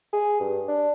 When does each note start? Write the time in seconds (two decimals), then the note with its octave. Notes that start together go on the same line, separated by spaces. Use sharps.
0.13 G#4
0.40 G2
0.68 D4